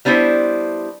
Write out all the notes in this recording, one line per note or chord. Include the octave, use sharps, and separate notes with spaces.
G3 B3 D4 E4 C5